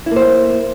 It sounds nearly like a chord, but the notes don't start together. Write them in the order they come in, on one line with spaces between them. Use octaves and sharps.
E4 A#3 C5